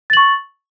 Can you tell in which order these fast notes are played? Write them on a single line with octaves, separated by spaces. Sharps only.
A6 F#7 C#6